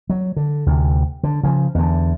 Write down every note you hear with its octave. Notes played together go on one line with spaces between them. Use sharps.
F#3
D3
D2 C3
D3
C#3 F3
E2 D3